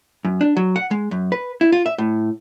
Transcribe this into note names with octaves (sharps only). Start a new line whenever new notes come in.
F#2
D4
F#3
F#5
G#3
F#2
B4
E4
F4
E5
A2